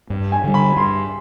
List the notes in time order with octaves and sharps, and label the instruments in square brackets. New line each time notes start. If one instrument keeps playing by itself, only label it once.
[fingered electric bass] G2
[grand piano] G#5
[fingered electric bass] D3 G3
[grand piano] B5
[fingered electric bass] G2 [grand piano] C6